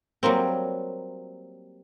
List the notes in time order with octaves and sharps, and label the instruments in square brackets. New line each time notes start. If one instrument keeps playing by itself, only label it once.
[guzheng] F#3 G3 A#3 C4